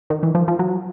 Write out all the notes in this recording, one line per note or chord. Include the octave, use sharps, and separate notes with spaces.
D#3
E3
F3
F3
F#3